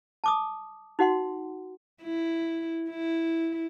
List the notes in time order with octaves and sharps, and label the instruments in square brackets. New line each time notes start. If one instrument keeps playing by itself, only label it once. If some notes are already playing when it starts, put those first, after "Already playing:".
[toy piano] A5 D6 D#6
D#4 F#4 F#5 C6
[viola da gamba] E4
E4